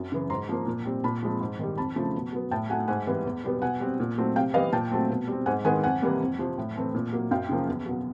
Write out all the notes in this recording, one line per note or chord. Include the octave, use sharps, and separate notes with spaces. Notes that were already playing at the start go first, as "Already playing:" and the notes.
Already playing: F#2
C#3 E3
G#2 A#5 C6
F3 A#3
A#2
G3 C4
A#2 A5 B5
F3 G#3 C4
G#2
D#3 G3
F2 A5 B5
C#3 F3 A3
B2
F#3 B3
A2 G5 A5
F#3 A3 F#5 G#5
G#2 F#5 G#5
E3 G3 B3
E2
B2 G3 B3
B2 F#5 G#5
G3 C4
A#2
F#3 A3 C4
C3 F5 G5
E3 G3 B3 D#5 F5
A#2 G5 A5
F#3 A3 C4
B2
G3 C4
G#2 F#5 G#5
D#3 G#3 B3 F#5 G#5
F2 F#5 G#5
C3 E3 G3 A#3
F2
C3 F3
A2
E3 A3 C4
A#2
F#3 A#3
F#2 F5 G5
C#3 F3 A#3
E2
B2 F#3